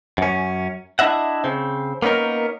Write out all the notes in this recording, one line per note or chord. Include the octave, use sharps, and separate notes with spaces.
F#2 C#4
D4 E4 D#5 E5 F#5
C#3 C4
A#3 B3 C#4 D#4 A#4